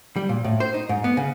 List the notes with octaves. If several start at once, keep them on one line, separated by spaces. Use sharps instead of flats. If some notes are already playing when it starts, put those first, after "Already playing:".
G3
A#2
A2
C5
D#4
G#2
B3
C#3